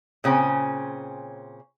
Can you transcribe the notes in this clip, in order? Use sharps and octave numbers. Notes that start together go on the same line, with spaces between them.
A#2 C#3 C4 C#4